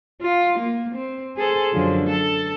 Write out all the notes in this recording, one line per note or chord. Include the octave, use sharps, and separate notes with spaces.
F4
A#3
C4
G#4 A4 C5
F#2 D3 F3
A4